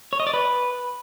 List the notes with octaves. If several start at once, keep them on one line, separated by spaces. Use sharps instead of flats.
C#5
D#5
D5
B4